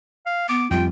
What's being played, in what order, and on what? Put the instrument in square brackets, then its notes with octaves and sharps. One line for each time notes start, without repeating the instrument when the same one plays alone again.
[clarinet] F5
[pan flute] B3 [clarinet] D6
[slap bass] F2 G3 [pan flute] F4 [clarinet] G5